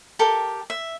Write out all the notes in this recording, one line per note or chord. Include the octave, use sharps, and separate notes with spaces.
G4 A4 A#4 G5
E5